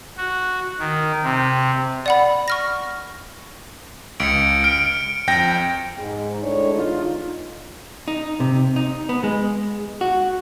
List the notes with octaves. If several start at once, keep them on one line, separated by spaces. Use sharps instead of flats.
F#4
D#3
C3
D5 F#5 B5
C#6 F6 A#6
C#2 C#7 D7
F6 D7
F2 G5 A#6
G#2
A2 G#3 D4 C#5
E2 D3 D#4 F4
D#4
C3
D#4
B3
G#3
F#4